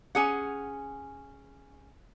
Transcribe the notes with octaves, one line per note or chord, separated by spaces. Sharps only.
C#4 G#4 F#5